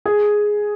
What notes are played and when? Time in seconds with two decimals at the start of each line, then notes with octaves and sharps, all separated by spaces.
0.06 G#4